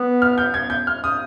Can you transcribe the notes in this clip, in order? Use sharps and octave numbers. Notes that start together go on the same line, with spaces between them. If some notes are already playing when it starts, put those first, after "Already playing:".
Already playing: B3
F6
G6
G#6
G6
F6
D#6